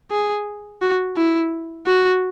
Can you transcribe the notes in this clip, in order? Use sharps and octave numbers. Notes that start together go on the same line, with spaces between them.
G#4
F#4
E4
F#4